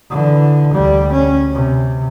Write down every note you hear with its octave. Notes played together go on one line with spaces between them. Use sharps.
D3 E3
D2 G3
C#4
C3